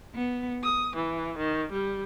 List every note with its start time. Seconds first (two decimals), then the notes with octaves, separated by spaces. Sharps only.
0.14 B3
0.63 D#6
0.95 E3
1.37 D#3
1.72 G3